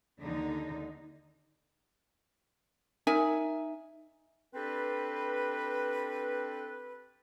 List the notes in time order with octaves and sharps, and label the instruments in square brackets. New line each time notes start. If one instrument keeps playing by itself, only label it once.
[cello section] D#2 D3 D#4
[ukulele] D#4 A#4 E5 G#5
[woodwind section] C4 D4 G4 A4 B4